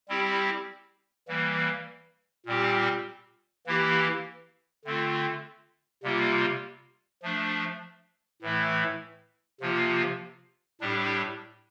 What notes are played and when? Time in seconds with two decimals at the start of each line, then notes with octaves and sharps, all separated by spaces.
0.08 G3 C4 E4 G4
1.28 E3 G3 A#3
2.46 A#2 G3 C4 G4
3.66 E3 A#3 E4 G4
4.85 D3 A3 C4 F4
6.03 C3 G3 A#3 F4
7.23 F3 A3 D4
8.42 A2 E3 A3 E4
9.61 C3 F3 A#3 F4
10.81 A2 G3 D4 G4